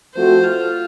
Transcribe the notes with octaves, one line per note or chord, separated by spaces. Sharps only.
F3 A3 C4 F#4 A4 C5
F4